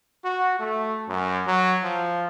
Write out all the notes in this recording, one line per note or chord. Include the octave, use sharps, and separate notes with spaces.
F#4
A3
F#2
F#3
F3